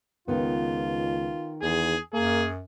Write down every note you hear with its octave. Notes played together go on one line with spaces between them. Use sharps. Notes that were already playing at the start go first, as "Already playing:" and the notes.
C#2 D#3 B3 F4
E2 G#4
F#2 A#3 G#4